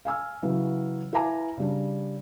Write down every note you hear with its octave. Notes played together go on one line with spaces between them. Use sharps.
F5 G#5 E6 F6
C#3 E3 F#3
E4 B4 F5 G#5 A#5 D6
C#3 G3 D4